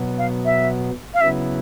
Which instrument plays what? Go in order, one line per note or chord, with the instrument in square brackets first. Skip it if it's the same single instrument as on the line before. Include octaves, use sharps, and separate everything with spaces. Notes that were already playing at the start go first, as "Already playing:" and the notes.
Already playing: [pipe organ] B2 F#3 B3
[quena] F5
E5
F5
[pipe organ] C#3 F#3 B3 E4 [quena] E5